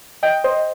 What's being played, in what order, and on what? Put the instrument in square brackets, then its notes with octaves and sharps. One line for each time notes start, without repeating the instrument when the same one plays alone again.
[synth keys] D#5 G5
C5 D#5